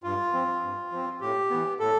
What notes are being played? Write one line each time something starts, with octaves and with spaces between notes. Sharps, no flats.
G2 F4
F3 C4
G2
F3 C4
A2 G4
E3 B3
A2 A4